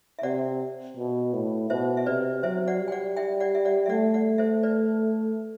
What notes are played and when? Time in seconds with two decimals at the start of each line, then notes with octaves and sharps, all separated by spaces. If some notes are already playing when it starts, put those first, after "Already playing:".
0.19 E5
0.23 C3 D5 F#5
0.97 B2
1.33 A2
1.70 B2 C5 E5
1.97 E5
2.06 C3 B4 D5
2.43 F#3 C5 E5
2.67 D5 F#5
2.80 G3
2.88 G5
2.92 D5 F#5
3.17 E5 G5
3.40 D5 F#5
3.55 E5
3.65 D5 F#5
3.86 E5
3.89 A3 D5 F#5
4.14 D5 F#5
4.38 C5 E5
4.63 B4 D5